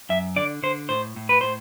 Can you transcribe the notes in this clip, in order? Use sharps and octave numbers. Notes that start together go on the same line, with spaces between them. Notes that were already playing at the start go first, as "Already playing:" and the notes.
F#2 E5
D3 D5
D3 C5
A2 C5
A2
B4
A2 C5